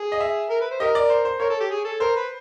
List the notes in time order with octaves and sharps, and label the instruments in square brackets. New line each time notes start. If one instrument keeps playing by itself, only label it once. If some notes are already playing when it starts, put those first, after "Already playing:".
Already playing: [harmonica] G#4
[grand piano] D#5
E5
[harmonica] A#4
B4
C5
[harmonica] G4 A#4 [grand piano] D#5
[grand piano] D5
C5
C5
[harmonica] A#4 [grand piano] C#5
[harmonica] A4
G4
G#4
A4
[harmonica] A#4 [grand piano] C5
[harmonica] B4